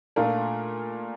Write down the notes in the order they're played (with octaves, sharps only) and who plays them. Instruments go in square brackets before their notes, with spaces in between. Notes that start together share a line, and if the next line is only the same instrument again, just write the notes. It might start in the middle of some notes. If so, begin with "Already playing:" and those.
[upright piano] A#2 A3 D4 F4 A#4